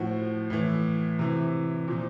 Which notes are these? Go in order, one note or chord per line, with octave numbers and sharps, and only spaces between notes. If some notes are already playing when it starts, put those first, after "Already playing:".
Already playing: A2 F3 F#4
A2 E3
C3 E3
A#2 F3